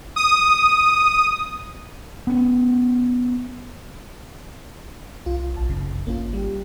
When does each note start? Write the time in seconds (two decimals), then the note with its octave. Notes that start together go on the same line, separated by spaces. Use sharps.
0.16 D#6
2.27 B3 C#4
5.26 C2 F4
5.57 A#1 A5
5.70 G1 C2 F#2 C#3
6.07 G#1 A#3 C#4 F4
6.33 G3 G4